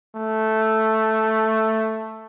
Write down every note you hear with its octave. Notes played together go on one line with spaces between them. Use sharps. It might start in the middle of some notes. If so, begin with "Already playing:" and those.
A3